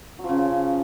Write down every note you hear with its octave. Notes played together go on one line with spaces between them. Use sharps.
F#3
F3
C#3